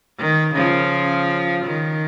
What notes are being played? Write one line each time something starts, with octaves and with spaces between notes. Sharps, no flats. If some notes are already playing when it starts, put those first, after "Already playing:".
D#3
C#3 F3
D#3